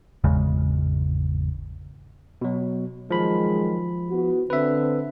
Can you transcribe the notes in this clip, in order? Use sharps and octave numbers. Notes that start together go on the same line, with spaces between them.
G#1 E2 C#3 G#3
B2 F#3
D#3 F3 F#3 G#3 B5
B3 E4 F#4
D3 C4 B4 E5